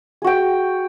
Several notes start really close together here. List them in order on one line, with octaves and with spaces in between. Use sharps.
G#4 F#4 G5